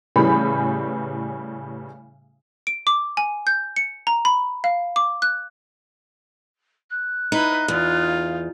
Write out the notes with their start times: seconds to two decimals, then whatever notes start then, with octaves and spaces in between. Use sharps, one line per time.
0.16 A2 C#3 E3 G3 G#4 B5
2.67 D7
2.87 D6
3.17 G#5
3.47 G6
3.76 C#7
4.07 A#5
4.25 B5
4.64 F5
4.96 D6
5.22 F#6
6.90 F#6
7.32 D#4 E4 B4
7.68 E2 D#4 F4
8.06 F5